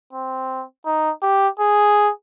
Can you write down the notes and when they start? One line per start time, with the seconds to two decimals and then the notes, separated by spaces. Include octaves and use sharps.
0.13 C4
0.86 D#4
1.22 G4
1.60 G#4